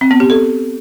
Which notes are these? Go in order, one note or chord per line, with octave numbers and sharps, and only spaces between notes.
C4
B3
G4
A4